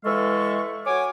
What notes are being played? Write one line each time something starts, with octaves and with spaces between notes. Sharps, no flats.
E3 G#3 A4 E5 F5 C#6
F#4 C#5 G#5 D6